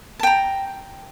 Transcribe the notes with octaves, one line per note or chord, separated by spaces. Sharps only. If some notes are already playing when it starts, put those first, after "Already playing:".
G5 A5 A#5